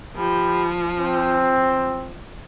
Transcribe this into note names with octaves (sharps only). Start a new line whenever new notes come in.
F3 G4 B5
C4